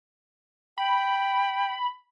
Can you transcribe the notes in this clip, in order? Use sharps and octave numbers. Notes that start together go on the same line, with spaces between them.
G5 B5